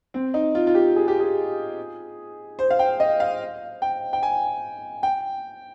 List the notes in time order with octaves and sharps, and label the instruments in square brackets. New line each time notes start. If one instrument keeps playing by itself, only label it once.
[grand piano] C4
D#4
F4
F4
G4
G#4
G4
G#4
C5
F5
G5
D#5
F5
G5
G5
G#5
G5